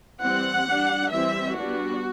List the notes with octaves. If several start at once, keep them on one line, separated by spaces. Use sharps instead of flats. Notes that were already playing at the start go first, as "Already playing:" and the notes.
E3 G3 C4 F#5
G3 D4
E3 G3 C4 E5
G3 B3 D4 F#4